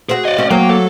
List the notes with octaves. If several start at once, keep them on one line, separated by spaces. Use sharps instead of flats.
C4 F#4 G#4
D5 D#5
C4 C#4 F#4
F#3 A#3 G5
A4